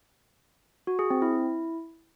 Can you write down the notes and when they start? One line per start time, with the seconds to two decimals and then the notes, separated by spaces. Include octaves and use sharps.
0.87 F#4
0.99 G#4
1.10 C4
1.22 E4